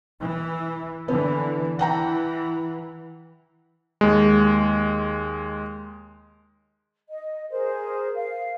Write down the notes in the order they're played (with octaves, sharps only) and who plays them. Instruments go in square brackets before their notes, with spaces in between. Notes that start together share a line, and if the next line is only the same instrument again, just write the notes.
[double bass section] E3
[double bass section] D3 E3 [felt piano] B3
[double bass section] E3 [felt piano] F#5 G5 A#5
[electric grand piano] D#2 G#3
[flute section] D#5
G#4 A#4 C5
F5